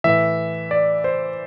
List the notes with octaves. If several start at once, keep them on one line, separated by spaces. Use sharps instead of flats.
A2 E3 E5
D5
C5